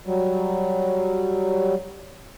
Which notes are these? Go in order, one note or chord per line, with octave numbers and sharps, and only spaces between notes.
F#3 G3